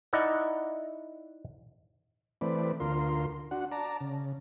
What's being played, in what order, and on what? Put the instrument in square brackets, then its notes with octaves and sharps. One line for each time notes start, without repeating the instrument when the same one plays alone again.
[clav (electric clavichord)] D#4 E4 D5 D#5 F#5
[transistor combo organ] E3 A3 C4 B4 D5
D2 F4 A#4 C6
D4 F#4 F#5
D5 A5 A#5
C#3